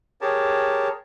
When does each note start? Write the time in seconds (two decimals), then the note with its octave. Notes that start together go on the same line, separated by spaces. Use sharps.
0.21 G4 G#4 A#4 C#5 A5